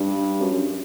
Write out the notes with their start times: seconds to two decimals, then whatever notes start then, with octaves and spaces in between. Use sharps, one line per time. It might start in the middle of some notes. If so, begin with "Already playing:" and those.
Already playing: G2
0.41 F#2
0.52 F#2